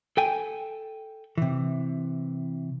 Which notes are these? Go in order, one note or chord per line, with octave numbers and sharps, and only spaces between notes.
A4 G5 G#5
C3 E3